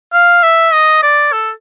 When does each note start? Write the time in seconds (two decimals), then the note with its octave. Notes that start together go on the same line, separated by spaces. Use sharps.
0.13 F5
0.43 E5
0.73 D#5
1.03 D5
1.33 A4